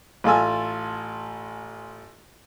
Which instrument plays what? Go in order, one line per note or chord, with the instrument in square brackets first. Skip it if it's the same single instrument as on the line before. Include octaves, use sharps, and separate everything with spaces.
[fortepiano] A1 F4 A4 G#5 E6